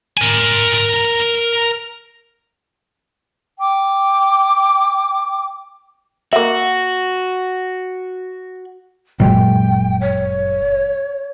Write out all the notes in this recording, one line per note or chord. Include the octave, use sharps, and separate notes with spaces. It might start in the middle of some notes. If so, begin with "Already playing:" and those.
A#4 G#5
G5 D6
A#3 F#4 E5
G1 F#2 A#2 F#3 G#3 G5
C#5